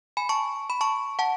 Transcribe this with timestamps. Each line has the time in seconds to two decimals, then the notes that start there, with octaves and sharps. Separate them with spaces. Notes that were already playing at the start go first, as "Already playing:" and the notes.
0.17 G#5 B5
0.29 A5 C#6
0.70 B5
0.81 A5 C#6
1.19 F#5 A5